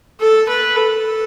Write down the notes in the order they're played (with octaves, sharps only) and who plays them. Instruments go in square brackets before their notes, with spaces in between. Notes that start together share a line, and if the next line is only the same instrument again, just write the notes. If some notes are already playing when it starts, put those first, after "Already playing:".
[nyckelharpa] A4
B4
A4